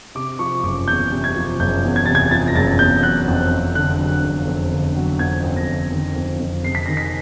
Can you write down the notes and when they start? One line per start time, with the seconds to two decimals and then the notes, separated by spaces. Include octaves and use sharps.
0.15 C3 D6
0.39 F3 C#6
0.63 F#1 D6
0.88 E2 G6
1.12 C3
1.24 G#6
1.36 F3
1.60 F#1 G6
1.84 E2
1.96 G#6
2.05 C3 A6
2.15 G#6
2.31 F3 A6
2.47 A#6
2.55 F#1 A6
2.79 E2 G6
3.03 F#3 F#6
3.28 F2
3.52 F2
3.75 D3 F#6
4.00 F#3
4.23 F2
4.48 F2
4.72 D3
4.96 F#3
5.19 F2 G#6
5.43 F2
5.56 A#6
5.68 D3
5.91 D#3
6.16 F2
6.40 F2
6.64 C3 C7
6.75 B6
6.86 D#3 A#6
6.97 B6